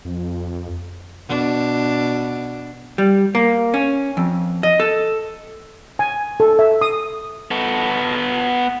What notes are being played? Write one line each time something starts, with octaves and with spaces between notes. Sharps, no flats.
F2
B2 D4
G3
A#3
C#4
F2
D#5
A4
G#5
A4
E5
D#6
B3 A4